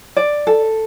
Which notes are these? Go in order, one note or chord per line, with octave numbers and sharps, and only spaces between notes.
D5
A4